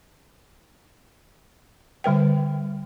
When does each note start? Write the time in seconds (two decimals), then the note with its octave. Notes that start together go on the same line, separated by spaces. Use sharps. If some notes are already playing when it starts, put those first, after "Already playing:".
2.04 D3 G3 B4 G5